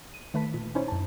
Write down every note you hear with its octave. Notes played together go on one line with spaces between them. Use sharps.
D#7
D#3 A3 B4 A5 B6
A#2
C#4 D#4 E4 C5 C#5
F#2 A5